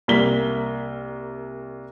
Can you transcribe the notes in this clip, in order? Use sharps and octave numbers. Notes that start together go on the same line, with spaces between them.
C2 A#3 B6 G7